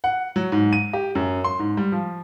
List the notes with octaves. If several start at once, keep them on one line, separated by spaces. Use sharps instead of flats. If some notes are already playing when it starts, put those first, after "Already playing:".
F#5
F#3
G#2
D#7
G4
F#2
C6
G#2
G3
F3